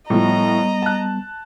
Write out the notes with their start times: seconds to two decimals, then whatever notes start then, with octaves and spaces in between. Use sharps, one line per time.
0.10 A2 F3 G3 B3 D#5 A#5
0.82 A5 F#6